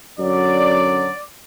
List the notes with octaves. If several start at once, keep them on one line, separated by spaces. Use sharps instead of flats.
F#2 D3 F#3 D5